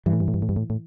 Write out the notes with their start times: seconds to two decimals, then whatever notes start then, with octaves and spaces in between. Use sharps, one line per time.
0.06 G2 E3
0.13 A2
0.20 G2
0.28 A2
0.34 G2
0.42 A2
0.49 G2
0.56 A2
0.70 A2